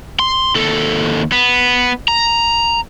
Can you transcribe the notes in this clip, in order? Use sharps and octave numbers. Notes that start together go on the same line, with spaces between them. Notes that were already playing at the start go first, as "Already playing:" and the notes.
C6
D#2 A4
B3
A#5